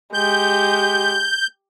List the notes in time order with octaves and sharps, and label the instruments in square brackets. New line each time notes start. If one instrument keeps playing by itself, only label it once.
[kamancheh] G#3 G4 [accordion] G6